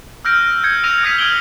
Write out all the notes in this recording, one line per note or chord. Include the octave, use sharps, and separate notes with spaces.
E6 F6 G6 A#6 D7
G6 G#6 C#7
E6 A#6 D7 D#7 F7
D#6 F6 G#6 B6 C7 D#7
E6 F6 G#6 D7 F#7 G7